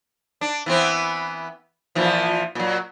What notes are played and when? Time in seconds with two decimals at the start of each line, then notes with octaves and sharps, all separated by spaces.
0.41 D4
0.66 E3 B3 C4
1.95 A#2 E3 F3
2.55 A#2 F#3